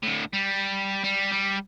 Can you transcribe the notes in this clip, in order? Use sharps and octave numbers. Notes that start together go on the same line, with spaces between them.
A2 D3
G3
G3
G3